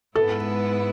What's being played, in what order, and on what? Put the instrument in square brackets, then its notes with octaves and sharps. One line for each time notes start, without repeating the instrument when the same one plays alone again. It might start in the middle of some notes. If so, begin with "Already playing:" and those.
[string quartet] G#2 G#3 B3 E4 B4 [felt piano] A4